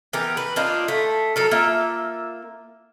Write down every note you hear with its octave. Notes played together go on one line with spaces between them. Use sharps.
E3 B3 G4 A#4
B4
A#3 D4 D#4 F4
A3
F#3 A4 A#4
A#3 F4 E5